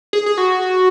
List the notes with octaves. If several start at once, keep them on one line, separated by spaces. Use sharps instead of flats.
G#4
G#4
F#4